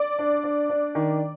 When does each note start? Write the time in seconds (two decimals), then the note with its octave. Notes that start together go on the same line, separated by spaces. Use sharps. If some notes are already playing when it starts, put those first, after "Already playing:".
Already playing: D5
0.19 D4
0.44 D4
0.69 D4
0.95 D#3